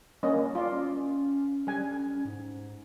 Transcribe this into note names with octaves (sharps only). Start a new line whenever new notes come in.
G3 A#3 C#4 D#5
F4 D5 C6
C#4
G3 G#5
G#2